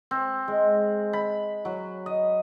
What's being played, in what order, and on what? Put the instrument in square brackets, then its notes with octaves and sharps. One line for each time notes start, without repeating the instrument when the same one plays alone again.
[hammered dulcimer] C4
G#3
B5
F#3
D#5